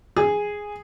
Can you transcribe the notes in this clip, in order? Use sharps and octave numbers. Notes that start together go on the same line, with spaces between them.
G#4